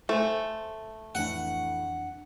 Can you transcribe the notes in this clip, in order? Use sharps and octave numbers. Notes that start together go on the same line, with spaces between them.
A3 A4 C5 G#5
F2 A2 E3 D4 F#5